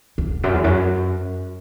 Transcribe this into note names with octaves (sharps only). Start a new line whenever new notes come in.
E2
F#2
E2
F#2